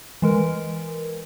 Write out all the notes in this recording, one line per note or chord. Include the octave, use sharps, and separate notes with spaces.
E3 G#3 A#4